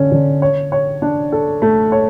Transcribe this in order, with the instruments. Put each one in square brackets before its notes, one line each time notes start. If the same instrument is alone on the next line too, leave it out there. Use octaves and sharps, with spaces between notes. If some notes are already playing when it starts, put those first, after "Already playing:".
Already playing: [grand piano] D3 C#4
D3
C#5
C#5
D4
A4
A3
C#5